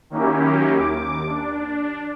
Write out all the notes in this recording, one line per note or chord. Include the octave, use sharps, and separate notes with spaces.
D#3 F#3 A#3 C#4 E4 G4
D#2 D6
D4